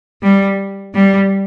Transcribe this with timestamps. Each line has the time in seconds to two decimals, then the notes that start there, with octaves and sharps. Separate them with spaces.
0.23 G3
0.95 G3